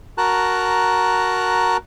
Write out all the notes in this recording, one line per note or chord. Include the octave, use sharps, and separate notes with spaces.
F#4 A#4 A5 A#5 F#6